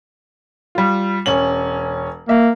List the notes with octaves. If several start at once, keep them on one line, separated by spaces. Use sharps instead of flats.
G3 F4
E1 C#4 F#7
A#3 E5